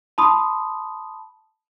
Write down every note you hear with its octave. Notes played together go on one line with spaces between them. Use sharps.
A5 B5 C6 D#6